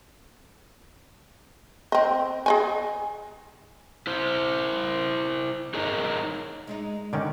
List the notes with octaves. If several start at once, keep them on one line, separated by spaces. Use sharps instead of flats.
C4 D#5
G#4 D#5 G#5
E4 C5
D#4 G#4 A#4 C#5 D#5
G#3 D4 D#4
D3 D#3 C#4 D5